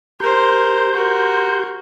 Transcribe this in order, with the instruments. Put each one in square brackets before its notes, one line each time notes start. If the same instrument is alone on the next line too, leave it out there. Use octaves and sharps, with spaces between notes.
[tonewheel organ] G4 C6 G6 [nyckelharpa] A#4 C5
[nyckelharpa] F#4 A#4